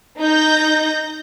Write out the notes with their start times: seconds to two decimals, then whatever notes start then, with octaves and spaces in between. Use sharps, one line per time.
0.20 D#4 G6 A#6